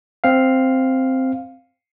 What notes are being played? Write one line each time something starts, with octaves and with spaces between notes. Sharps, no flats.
C4 F5